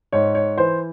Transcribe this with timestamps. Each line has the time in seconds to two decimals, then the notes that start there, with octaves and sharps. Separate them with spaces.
0.12 G#2 C#5
0.35 C#5
0.57 E3 C5